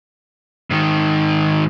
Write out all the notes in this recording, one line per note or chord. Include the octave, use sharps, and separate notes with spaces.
G#2 D#3